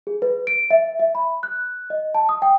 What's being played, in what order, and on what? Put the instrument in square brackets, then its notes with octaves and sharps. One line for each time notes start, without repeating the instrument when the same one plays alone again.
[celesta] G#4
B4
D7
E5
E5
B5
F#6
D#5
A5
D#6
G5